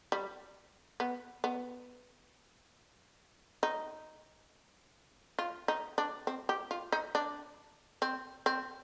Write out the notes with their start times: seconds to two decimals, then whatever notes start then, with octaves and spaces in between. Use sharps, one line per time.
0.12 G3
1.00 B3
1.44 B3
3.63 D#4
5.39 F4
5.68 D#4
5.98 D4
6.27 C4
6.49 G4
6.71 F4
6.92 D#4
7.15 D4
8.02 C4
8.46 C4